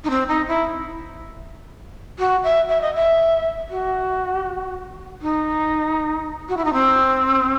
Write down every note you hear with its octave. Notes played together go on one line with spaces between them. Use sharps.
D#4
C4
D#4
E4
F#4
E5
E5
D#5
E5
F#4
D#4
F#4
E4
D#4
C4